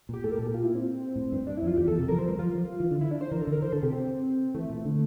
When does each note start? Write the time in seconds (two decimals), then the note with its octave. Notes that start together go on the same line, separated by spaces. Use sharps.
0.09 A#2
0.13 G4
0.24 A2 A4
0.32 A#4
0.38 A#2 A4
0.47 G4
0.54 F4
0.64 E4
0.75 C4
1.16 A2
1.32 G2
1.47 G2 D4
1.57 E4
1.63 F2
1.67 F4
1.77 E2 G4
1.88 E2 A4
1.98 C3 A4
2.08 F3 A#4
2.18 F3 C5
2.28 G3 A#4
2.39 F3 F4
2.55 F3
2.80 E3
2.91 D3
3.01 E4
3.11 D4
3.21 C5
3.31 E3 A#4
3.41 A4
3.47 D3
3.52 A#4
3.62 E3 C5
3.72 D3 A4
3.82 C3 G4
3.93 C4
4.54 E3 A3
4.70 A#2
4.85 D3